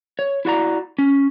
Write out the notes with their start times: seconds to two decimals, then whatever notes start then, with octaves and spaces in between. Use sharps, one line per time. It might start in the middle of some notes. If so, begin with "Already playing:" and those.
0.19 C#5
0.45 E4 F#4 D5 A#5
0.99 C#4